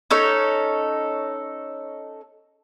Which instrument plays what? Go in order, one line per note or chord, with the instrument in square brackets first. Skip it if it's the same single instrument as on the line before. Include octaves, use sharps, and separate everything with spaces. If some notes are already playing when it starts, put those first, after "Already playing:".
[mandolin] C#4 D#4 A4 C#5